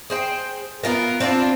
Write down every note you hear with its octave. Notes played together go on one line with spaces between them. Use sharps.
G#4 C5 G5
B3 D#4 F4 A#4
C4 D4 D#4 F4